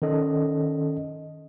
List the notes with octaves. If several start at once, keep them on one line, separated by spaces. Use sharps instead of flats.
D#3 C#4 A4 D#5